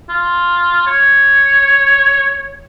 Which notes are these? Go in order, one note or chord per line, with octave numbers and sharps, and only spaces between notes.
F4
C#5